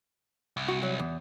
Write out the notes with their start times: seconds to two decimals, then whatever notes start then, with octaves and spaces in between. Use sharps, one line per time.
0.57 C2
0.68 F#4
0.83 F#3
0.99 E2